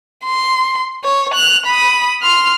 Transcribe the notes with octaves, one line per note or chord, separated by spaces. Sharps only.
C6
C#5
F#6 F7
B5 D#6
C6 F6